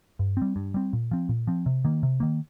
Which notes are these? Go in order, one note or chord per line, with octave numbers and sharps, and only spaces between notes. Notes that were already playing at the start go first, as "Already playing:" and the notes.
G2
G3 C4
G2
G3 C4
A#2
F3 C4
A#2
F3 C4
C3
D#3 A#3
C3
D#3 A#3